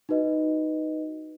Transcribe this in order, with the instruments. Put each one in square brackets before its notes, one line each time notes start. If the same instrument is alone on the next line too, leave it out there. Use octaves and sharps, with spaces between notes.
[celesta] D#4 F#4 B4 D#5